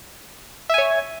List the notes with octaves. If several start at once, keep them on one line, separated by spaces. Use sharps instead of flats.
C#5 E5 G#5